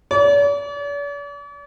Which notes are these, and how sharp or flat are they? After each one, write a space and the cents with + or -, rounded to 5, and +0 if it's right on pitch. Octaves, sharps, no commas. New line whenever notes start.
D5 -45